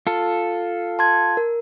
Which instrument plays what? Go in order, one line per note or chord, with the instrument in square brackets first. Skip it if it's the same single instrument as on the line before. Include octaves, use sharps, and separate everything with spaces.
[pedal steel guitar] F4 A4
[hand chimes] A5 C6 G#6
A#4